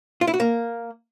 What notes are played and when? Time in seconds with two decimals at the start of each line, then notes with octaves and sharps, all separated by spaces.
0.21 F4
0.27 E4
0.34 F#4
0.40 A#3